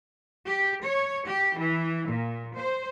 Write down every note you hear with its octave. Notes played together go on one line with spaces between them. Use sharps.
G4
C#5
G4
E3
A#2
C5